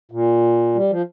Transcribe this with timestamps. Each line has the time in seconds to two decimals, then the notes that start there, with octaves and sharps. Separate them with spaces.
0.12 A#2
0.75 G3
0.91 F3